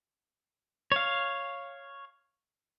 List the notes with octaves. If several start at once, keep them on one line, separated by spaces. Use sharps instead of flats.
C#5 F5